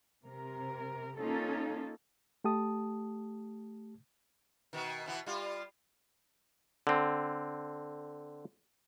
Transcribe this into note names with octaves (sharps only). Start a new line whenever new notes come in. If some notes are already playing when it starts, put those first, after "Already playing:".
C3 A#4
A#3 C#4 D#4 F4 A4
A3 G4 A5 D#6
B2 D#3
B2 E3 B3
G3 F4
D3 C4